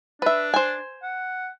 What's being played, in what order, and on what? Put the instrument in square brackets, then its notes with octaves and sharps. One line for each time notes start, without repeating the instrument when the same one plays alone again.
[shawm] D4 [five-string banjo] B4 E5
[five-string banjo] C5 G#5
[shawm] F#5